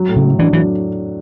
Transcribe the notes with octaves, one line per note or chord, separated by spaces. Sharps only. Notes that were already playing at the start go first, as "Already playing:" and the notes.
Already playing: F#3
A2
C#3
A3
E3 D4
E3 F#3